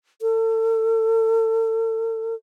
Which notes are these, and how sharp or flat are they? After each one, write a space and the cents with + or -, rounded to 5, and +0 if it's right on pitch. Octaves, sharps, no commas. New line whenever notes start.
A4 +35